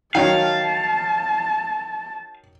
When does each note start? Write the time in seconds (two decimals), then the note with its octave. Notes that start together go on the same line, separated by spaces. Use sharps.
0.15 D#3 F#3 C#4 F5 G5 A5